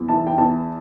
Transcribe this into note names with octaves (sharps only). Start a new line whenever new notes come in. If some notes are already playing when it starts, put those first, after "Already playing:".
Already playing: E2
E3 A5
G5
E2 A5